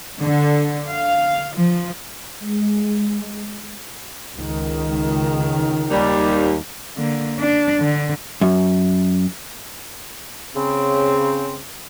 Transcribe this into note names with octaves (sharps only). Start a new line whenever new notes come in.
D3
F5
F3
G#3
C#2 D#3
D#2 G3
D3 A#3
D4
D3
F#2
C#3 C4